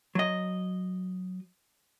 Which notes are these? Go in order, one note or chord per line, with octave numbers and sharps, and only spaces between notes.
F#3 D#5